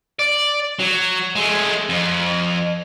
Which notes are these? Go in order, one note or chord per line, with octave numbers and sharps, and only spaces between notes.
D5
F#3
G#3 A3
F2